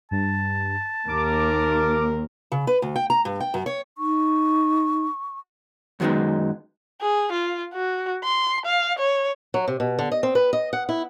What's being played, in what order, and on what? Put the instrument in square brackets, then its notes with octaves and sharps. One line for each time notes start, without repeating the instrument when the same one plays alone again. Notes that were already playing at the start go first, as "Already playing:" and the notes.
[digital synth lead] G2 [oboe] A5
[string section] D#2 [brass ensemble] A#4 [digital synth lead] D6
[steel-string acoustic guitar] C#3
B4
D2
G5
A#5
G2
G5
F#2
C#5
[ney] D#4 [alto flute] C#6
[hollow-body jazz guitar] F#2 D#3 F#3 G#3 B3 D#4
[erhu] G#4
F4
F#4
C6
F5
C#5
[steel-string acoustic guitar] F#3
C3
B2
D3
D#5
C4
B4
D#5
F#5
E4